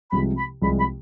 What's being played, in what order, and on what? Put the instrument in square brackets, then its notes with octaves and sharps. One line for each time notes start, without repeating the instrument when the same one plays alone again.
[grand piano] C2 C3 F3 G#3 [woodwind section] B5
[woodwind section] B5
[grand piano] C2 C3 F3 G#3 [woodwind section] B5
[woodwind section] B5